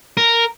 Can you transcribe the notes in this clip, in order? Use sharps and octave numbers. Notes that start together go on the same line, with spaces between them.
A#4